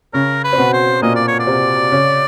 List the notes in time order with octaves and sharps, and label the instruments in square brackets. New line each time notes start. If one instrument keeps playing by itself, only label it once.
[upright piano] C#3 C#4 [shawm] A#4
[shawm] B4
[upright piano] C4
B2 B3
[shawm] C5
[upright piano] A#2 A#3 [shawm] D#5
[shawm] D5
C#5
D5
[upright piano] C3 C4
C#3 C#4